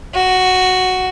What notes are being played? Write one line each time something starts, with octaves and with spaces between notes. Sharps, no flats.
F#4